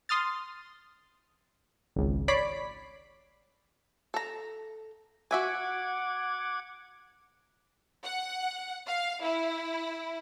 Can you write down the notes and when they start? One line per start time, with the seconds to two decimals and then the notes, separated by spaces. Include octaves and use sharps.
0.09 C6 D#6 F6 A6
1.96 G#1 C#2
2.28 C#5 D5 B5 B6 C7 D7
4.14 A4 A#5
5.31 F#4 E5 F#5 G#5 D6 G#6
8.05 F#5
8.87 F5
9.23 E4